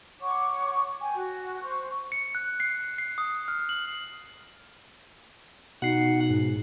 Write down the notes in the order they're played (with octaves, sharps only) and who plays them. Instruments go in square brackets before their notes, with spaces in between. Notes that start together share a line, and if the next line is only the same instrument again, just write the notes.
[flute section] C#5 F#5 C#6 D6
G5 G#5
F#4
C5 C#6
[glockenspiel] C#7
F#6
C7
C7
D#6
F6
F#7
[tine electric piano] B2 C7 [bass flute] D#4 [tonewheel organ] F#5
[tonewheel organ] G#2